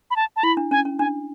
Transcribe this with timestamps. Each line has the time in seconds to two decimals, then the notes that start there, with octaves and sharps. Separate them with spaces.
0.11 B5
0.16 A5
0.36 A5
0.43 E4 B5
0.57 D4
0.71 C#4 G#5
0.85 C#4
0.99 D4 G#5